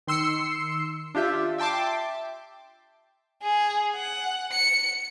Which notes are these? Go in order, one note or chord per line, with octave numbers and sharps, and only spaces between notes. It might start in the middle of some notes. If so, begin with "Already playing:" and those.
D#3 C6 E6 C7 C#7
D4 F4 G4 E5
E5 G5 A5 C6 D6
G#4
F#5
C#7